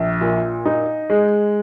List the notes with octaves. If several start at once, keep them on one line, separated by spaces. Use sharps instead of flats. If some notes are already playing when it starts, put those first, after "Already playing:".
Already playing: A#1
A#2
D#4
G#3